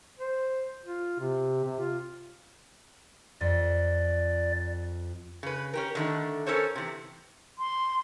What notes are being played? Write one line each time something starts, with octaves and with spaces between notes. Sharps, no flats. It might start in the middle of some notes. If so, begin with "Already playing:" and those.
C5
F4
C3
C3
F4
F2 D5
C#3 B4
C#4 G4 A#4
D3 D#3 A3
C#4 A4 A#4 C5 C#5
C3 E3
C6